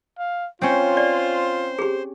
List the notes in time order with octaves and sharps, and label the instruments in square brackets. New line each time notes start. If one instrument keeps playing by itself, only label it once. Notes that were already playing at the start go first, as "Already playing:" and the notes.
[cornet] F5
[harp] C4 C#4 [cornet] F4 [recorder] C5
[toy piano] D5
G4 G#4